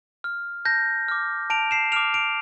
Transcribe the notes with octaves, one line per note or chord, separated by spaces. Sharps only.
F6
A5 G6 A#6
D6 F6
A5 D7 F7
C7 E7
D6 F6 D7 F7
D7 F7